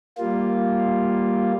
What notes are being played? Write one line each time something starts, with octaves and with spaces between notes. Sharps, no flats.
G3 A#3 F4